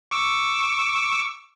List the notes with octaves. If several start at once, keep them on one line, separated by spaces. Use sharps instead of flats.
C#6 D6 E6